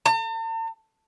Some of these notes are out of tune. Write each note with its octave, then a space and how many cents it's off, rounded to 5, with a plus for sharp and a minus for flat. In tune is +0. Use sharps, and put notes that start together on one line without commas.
A5 +45